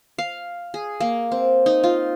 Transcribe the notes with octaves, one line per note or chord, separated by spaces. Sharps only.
F5
G#4
A#3
C4
D#4
F4